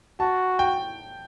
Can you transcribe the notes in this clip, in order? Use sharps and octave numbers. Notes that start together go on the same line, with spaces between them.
F#4 A5
G5